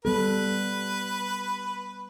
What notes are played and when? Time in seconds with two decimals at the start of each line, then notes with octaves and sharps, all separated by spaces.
0.05 G3 B3 A4 B4